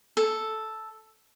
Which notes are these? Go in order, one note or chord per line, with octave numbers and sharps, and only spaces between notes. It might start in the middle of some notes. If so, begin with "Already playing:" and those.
A4